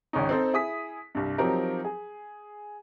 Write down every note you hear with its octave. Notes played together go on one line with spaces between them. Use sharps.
G#1 C#2 C#4 D#4
C4 D#4 A4 C5
E4 G#4 D#6 B6
C2 G2
F3 F#3 C4 D#4 G4 A#4
G#4